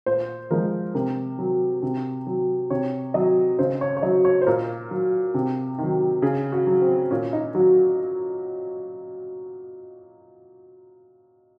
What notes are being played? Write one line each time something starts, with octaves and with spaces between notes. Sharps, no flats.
A#2 C5
F3 G#3 A#4
C3 A#4
F#3
C3
F#3
C3 C#5
F#3 D#5
C#3 C5
C#5
C#5
F#3 D#5
C#5
C5
A#2 A#4
F#3
C3
D#3 F#3
C#3 G#4
F#4
F#3
C4
A#2 C#4
D#4
F#3 F#4